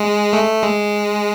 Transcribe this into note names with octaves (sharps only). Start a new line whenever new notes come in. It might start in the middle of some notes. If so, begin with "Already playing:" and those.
Already playing: G#3
A3
G#3